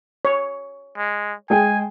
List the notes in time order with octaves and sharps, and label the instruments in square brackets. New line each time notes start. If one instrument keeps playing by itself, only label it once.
[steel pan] C#5
[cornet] G#3
[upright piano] G#3 G#4 G5 [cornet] G#5